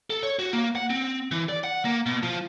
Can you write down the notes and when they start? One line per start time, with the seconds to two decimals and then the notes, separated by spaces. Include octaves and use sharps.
0.10 A4
0.23 C#5
0.39 F#4
0.53 A#3
0.75 F#5
0.90 C4
1.31 E3
1.49 D5
1.64 F#5
1.85 A#3
2.06 B2
2.23 F3